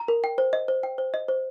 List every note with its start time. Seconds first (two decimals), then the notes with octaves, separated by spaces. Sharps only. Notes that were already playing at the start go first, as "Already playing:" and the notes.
Already playing: A#5
0.08 A#4
0.24 G5
0.38 C5
0.53 D#5
0.68 C5
0.83 G5
0.98 C5
1.14 D#5
1.28 C5